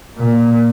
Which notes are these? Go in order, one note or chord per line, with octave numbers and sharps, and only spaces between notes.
A#2